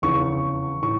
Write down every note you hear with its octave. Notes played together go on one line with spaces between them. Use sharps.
F1 E2 C#3 E3 C#6
A2 E3 C#6